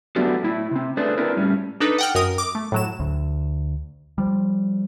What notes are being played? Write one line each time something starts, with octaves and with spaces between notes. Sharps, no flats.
F#3 A3 B3 D4 F#4 G4
A2 E4
C3 C4
A3 D4 G#4 B4 C5
A#3 C4 D4 E4 A#4 B4
A2 G3 C#4
D4 D#4 A4 B4
F#5 G5 F6
F#2 A#4 D#6
D6
A3
A2 F#3 E7
D2
F3 G3